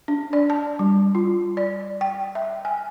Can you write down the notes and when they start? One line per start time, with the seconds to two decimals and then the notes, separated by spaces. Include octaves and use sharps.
0.08 D4
0.33 D5
0.50 A5
0.79 G3
1.15 F4
1.57 D5
2.01 G5
2.35 E5
2.65 G#5